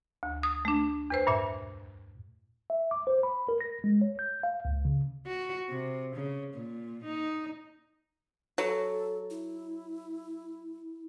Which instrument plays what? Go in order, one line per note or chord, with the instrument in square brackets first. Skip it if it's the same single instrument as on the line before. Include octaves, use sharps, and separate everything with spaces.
[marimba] D2
D#6
A3 D4
E2 B4 C5
G2 A#2 E5
[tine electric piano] E5
D6
C5
B5
A#4
A#6
G#3
C#5
G6
F5
C#2
C#3
[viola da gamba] F#4
C3
C#3
A#2
D#4
[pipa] F#3 [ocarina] A4
[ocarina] E4